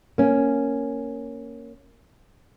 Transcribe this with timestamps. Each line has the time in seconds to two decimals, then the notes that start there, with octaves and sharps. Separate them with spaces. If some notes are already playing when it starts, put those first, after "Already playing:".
0.18 A#3 C#4